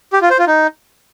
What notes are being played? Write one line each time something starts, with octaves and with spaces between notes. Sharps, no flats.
G4
F4
C5
F4
D#4